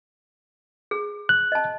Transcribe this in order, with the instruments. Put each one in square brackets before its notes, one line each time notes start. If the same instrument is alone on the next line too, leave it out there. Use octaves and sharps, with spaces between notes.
[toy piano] G#4
[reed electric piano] F#6
[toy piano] D#5 A5